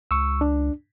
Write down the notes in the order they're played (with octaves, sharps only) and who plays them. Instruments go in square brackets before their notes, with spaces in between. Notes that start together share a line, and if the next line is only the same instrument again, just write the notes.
[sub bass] C#2 [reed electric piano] C#6 E6
[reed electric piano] D4